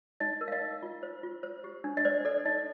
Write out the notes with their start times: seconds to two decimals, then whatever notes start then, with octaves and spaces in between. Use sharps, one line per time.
0.20 D#4 D#5
0.41 A#4
0.48 F5
0.52 D#5
0.61 D#4
0.83 F4
1.03 C5
1.23 F4
1.43 C5
1.64 G4
1.84 D4
1.97 D#5
2.05 C5 D5
2.25 A4 D5
2.45 D#4 D#5